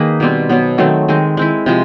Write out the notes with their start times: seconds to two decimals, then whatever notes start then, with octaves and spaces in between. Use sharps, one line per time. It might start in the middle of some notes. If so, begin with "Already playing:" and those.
Already playing: D#3 A#3 D#4 G#4 B4
0.20 B2 G3 C4
0.49 B2 F#3 B3
0.78 D#3 F#3 A3 C4
1.08 D#3 G#3 C4
1.37 G#3 C4 E4
1.66 C3 F3 G#3